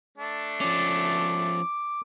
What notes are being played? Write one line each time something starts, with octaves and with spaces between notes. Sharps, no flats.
A3 D4
F3 C#4 D6